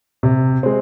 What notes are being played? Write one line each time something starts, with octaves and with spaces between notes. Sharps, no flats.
C3
G#3 C4